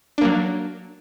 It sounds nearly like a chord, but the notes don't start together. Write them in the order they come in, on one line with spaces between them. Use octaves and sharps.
D4 A#3 F#3